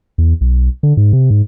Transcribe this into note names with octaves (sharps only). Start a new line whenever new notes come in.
E2
B1
D3
G#2
C3
G#2